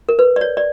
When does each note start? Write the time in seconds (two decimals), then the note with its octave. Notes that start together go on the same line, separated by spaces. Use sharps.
0.09 A#4
0.19 B4
0.36 D5
0.41 C#5
0.57 D5